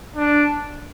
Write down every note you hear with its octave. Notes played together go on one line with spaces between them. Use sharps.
D4